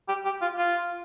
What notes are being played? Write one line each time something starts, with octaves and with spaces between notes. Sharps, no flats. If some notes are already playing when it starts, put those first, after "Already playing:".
G4
G4
F4
F4